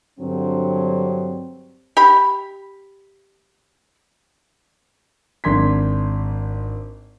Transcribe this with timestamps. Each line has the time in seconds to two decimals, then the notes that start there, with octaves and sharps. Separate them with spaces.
0.19 G2 D3 F#3 C4
1.97 G4 B5
5.44 G#1 D4 C6 G#6 B6